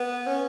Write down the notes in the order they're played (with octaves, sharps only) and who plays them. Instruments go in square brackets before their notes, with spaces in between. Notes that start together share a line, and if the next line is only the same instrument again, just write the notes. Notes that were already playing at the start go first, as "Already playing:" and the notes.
Already playing: [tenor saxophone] B3
C#4